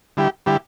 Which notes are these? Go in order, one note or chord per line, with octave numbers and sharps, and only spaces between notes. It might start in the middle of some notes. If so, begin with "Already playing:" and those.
D3 G3 E4 G4
D3 G3 E4 G4